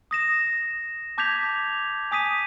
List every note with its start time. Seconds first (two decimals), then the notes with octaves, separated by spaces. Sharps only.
0.11 D#6 A#6 E7
1.18 A5 D6 G6 G#6 B6 F7
2.11 G#5 D#6 B6 D#7